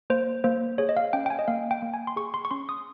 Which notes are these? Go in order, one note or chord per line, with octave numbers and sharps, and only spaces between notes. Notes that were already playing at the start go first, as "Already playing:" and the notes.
A#3 C5
A#3 C5
G#4 C#5
D#5
F5
C#4 G5
G5
G#5
D#5
A#3 F5
G5
A#3
G#5
C6
G#4 C#6
C6
C#6
C#4 C6
D#6